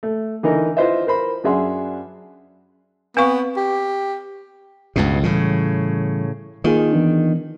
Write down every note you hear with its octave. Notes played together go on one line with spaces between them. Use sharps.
A3
D3 E3 D#4 A#4
E4 F4 B4 C5 D#5 E5
A#4 C5 B5
F#2 D4 G#4 E5 F#5 C6
B3 C4 F5 C#6
G4
C#2 G2 B2
A2 C#3 E3 G3
D#3 A#3 F4 G#4
E3 B3 D4